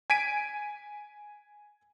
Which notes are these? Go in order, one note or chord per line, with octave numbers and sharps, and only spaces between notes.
G#5 G#6 B6 D7 D#7